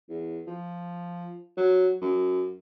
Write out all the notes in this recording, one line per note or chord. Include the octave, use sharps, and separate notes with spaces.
E2
F3
F#3
F#2